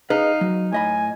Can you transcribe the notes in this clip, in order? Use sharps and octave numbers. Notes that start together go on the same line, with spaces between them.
D#4 G#4 B4 F5
F#3
A2 D#5 G#5 B5